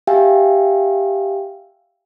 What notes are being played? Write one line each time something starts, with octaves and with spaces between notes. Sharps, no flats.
G4 E5 F5 G5 G#5